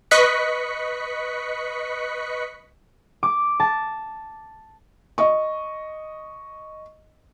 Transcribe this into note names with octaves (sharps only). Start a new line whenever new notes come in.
B4 D#5 C#6 F#6 B6 C#7
D6
A5
D#5 C#6